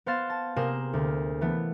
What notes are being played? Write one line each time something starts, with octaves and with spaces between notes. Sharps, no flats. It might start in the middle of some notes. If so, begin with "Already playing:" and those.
B3 C5 F5 C6 A6 E7
A5
C3 A#3 G#4 C5 G#5 E7
D2
E3 A3 B3